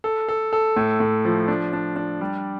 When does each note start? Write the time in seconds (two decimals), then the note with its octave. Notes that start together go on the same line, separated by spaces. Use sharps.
0.04 A4
0.29 A4
0.53 A4
0.76 A2
1.00 A2
1.25 F3
1.48 D4
1.73 D4
1.96 D4
2.21 G3